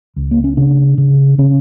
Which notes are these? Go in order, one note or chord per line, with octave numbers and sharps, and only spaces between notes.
C#2
A#3
C#4
C#3 D4
C#3
C#3 C#4